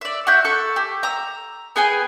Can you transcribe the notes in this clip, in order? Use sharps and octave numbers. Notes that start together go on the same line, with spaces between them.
D5 E5
F#4 E5 G6
A4 C#6
G4
A#5 E6
B3 G#4 G5 G#5